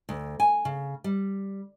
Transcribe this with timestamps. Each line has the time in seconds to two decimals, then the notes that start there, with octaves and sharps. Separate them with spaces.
0.09 D2
0.40 G#5
0.65 C#3
1.04 G3